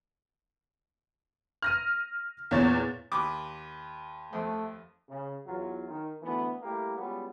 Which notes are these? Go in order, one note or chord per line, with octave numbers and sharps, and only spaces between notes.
F6 A#6 D#7
E2 A#2 C#5 A6
D#2 B5 D6
F2 A3
C#3
E2 F#3 F4
D#3
D2 E3 B3
G3 A3 A#3 E4 G4
G3 G#3 B3 C#4 F4 F#4